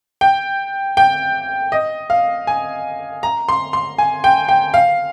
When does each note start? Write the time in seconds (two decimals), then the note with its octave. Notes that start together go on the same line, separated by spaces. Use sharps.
0.21 G5
0.97 G5
1.72 D#5
2.10 F5
2.47 G#5
3.23 A#5
3.49 C6
3.73 C6
3.98 G#5
4.24 G5
4.49 G5
4.74 F5